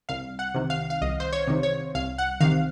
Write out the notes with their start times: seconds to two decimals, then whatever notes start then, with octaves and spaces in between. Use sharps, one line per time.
0.09 C2 F5
0.39 F#5
0.54 C3 D#3
0.70 F5
0.90 F5
1.02 C2 D#5
1.20 C5
1.33 C#5
1.47 C3 D#3
1.63 C#5
1.95 C2 F5
2.18 F#5
2.40 C3 D#3 F5